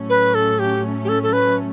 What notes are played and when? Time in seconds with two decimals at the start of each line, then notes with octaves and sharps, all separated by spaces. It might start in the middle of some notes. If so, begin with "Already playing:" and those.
Already playing: A2 F#3 A3 C#4
0.10 B4
0.35 A4
0.59 G4
1.04 G4
1.09 A4
1.23 A4
1.33 B4